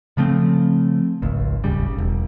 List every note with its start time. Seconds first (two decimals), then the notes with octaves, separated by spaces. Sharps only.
0.17 C#3 F3 A3 C4
1.22 G#1 C#2
1.64 D#1 G#1 C#3 G3
1.98 E1